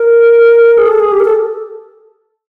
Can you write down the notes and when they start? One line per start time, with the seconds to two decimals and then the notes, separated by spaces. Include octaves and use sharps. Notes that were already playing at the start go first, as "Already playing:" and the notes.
Already playing: A#4
0.78 G#4
0.87 A4
1.00 G#4
1.12 G4
1.20 A#4
1.25 A4